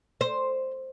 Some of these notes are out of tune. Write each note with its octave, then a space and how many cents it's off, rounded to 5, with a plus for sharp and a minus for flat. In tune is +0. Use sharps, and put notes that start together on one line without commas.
C5 +5